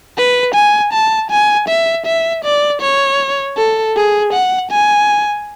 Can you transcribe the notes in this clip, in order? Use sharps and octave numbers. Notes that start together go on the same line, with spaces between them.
B4
G#5
A5
G#5
E5
E5
D5
C#5
A4
G#4
F#5
G#5